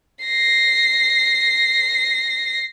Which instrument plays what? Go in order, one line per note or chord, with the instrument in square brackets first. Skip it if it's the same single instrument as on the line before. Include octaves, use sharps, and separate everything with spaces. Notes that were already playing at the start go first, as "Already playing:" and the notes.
[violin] A#6 C7